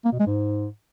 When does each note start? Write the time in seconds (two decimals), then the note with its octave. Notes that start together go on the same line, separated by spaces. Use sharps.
0.05 A#3
0.12 B2
0.20 G#3
0.27 G#2